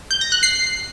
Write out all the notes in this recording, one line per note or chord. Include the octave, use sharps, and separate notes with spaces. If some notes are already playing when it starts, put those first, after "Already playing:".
G6
A#6
F#6
C7